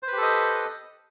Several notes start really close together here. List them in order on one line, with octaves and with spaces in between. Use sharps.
C5 B4 G4 A4 D#5